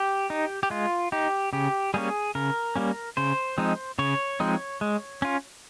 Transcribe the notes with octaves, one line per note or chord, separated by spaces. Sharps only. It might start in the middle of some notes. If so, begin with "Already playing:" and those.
Already playing: G4
D#4
G4
G#3 F4
D#4 G4
C#3 G4
G3 A#3 C#4 G#4
C#3 A#4
G3 A#3 C#4
C#3 C5
F3 G#3 C4 D#4
C#3 C#5
F3 G#3 C4 D#4
G#3
C#4 F4